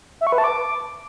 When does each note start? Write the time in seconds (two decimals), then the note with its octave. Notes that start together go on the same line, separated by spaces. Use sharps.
0.21 E5
0.27 C#6
0.32 B4
0.38 A5
0.44 D6